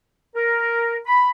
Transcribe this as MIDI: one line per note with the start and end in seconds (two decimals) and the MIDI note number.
0.35 0.97 70
1.06 1.29 83